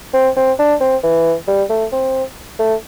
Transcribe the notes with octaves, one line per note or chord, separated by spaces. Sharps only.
C4
C4
D4
C4
E3
G3
A3
C4
A3